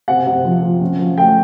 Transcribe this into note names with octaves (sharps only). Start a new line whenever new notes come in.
C3 F#5
C3
F3
F3
C#4
F3
A3 G5